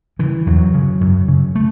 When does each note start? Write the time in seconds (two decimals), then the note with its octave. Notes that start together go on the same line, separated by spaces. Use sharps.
0.19 C#3 E3
0.46 E2 F#3
0.74 C#3
1.01 F#2
1.28 C#3
1.55 A3